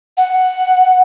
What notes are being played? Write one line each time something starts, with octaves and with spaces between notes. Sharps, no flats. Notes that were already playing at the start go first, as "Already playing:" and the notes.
F#5